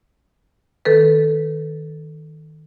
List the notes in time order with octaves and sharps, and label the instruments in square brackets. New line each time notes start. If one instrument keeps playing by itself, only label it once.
[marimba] D#3 A4 B4